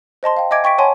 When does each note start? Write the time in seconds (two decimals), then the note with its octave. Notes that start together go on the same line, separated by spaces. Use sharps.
0.23 C5 D#5 A5 C6
0.37 F5 G5
0.51 D#5 E5 G#5 D6 G#6 D7
0.64 G5 C#6 A6 B6 D7
0.78 C#5 F#5 G#5 A5 C6